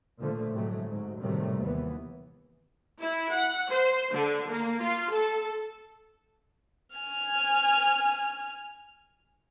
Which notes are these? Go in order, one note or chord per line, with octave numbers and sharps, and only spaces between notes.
A#2 D3 F3 A3
A2 C3 F#3 G#3 A3
G#2 F#3
A2 C3 D#3 F#3 G3 A3
D#2 E3 B3
E4
F#5
C5
D3
A#3
F4
A4
G#5 F6